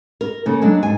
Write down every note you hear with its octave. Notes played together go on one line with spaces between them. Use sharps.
A#4
C#3 A#3 A4
F#3 G#3 A#3 D4
G#2 G#5